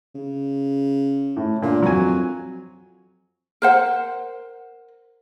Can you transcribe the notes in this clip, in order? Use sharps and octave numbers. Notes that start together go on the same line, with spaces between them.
C#3
A2
A#2 D3
F2 F#3 G#5
A#4 C5 F#5